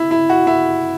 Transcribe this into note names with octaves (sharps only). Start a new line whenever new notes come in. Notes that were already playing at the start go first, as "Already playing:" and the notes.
Already playing: E4
E4
F#4
E4